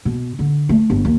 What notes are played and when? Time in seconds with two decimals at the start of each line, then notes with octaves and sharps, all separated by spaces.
0.05 B2
0.39 D3
0.69 A3
0.90 G1
1.05 D#2